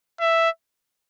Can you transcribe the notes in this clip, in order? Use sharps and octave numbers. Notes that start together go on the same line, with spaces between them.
E5